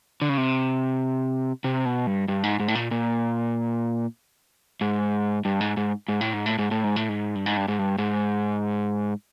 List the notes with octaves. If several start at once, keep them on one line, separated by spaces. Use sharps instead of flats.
D3
C#3
C3
C3
B2
G2
G2
G#2
G#2
A2
A#2
A#2
G#2
G2
G#2
G#2
G#2
A2
G#2
A2
G#2
A2
G#2
A2
G#2
G2
G#2
G2
G#2
G2
G#2